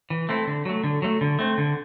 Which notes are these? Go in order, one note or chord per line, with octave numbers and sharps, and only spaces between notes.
E3
A3 C4 E4 A4
D3
F#3 A3
D3
F#3 A3
D3
A3 C4
D3